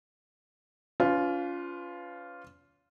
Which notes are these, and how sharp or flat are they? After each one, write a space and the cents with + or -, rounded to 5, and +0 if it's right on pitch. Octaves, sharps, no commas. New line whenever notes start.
C#4 +40 F4 +0 B4 +35